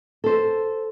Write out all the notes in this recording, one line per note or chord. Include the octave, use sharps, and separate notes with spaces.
A4 C5